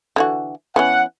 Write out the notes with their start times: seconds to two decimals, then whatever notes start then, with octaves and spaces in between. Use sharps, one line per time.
0.16 D3 E3 F#4
0.76 E3 B3 C#4 F#5